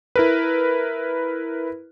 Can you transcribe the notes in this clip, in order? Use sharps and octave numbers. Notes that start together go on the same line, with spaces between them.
E4 A#4 B4